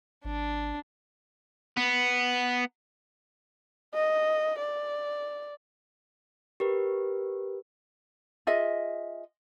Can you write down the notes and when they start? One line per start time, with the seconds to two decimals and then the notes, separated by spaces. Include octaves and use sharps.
0.25 G#1 D4
1.77 B3
3.94 D#5
4.59 D5
6.60 G4 A#4 B4
8.47 F4 G#4 D#5 E5